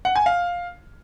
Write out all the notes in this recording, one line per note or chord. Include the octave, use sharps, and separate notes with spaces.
F#5
G#5
F5